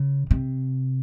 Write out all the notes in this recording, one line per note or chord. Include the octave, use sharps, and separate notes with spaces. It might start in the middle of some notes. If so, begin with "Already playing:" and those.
Already playing: C#3
C3